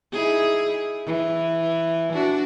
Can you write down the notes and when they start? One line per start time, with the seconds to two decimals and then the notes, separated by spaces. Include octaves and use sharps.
0.12 D#4 E4 G#4
1.06 E3
2.13 D4 F#4